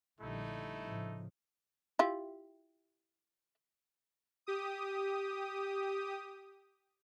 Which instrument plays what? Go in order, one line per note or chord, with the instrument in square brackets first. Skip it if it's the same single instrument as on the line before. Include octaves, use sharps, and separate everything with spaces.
[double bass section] A#1 D3 G3 [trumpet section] A3 D#4 E4
[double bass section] A2 C#3 F3
[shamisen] E4 F4 G4
[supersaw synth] G4 D#6